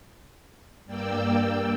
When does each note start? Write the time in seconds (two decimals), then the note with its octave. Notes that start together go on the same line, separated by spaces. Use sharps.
0.85 G2 A#3 D5 G5 E6